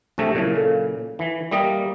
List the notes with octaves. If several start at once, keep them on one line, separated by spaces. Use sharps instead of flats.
A#1 C3 A3
A#2 C#3 F#3 E4
A4 F5
E3
G3 A#3 D#5 E5 G5